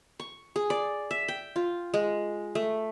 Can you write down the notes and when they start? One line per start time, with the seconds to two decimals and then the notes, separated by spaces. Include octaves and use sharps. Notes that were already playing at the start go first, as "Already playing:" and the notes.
0.20 C#6
0.56 G#4
0.70 D5
1.11 E5
1.28 G5
1.56 F4
1.94 G#3
2.55 A3